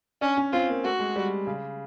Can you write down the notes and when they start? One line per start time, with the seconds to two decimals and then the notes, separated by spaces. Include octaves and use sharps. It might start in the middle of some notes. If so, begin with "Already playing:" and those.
0.21 C#4 D4
0.37 C#4
0.53 C4 F4
0.69 A#3
0.84 A3 F#4
1.00 G#3
1.16 G3
1.47 C#3